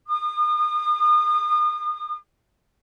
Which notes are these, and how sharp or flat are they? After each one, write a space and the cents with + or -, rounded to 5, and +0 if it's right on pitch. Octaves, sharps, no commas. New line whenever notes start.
D#6 -35